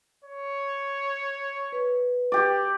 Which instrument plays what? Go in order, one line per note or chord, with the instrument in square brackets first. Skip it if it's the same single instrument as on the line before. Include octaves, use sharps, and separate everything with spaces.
[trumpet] C#5
[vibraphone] B4
[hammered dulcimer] G4 D5